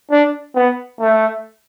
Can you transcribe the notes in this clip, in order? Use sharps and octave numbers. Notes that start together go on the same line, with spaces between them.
D4
B3
A3